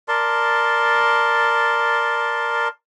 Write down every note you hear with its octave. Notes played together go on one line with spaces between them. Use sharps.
A#4 D5 A5 C6